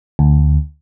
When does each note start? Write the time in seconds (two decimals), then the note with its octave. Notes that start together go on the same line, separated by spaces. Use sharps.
0.19 D2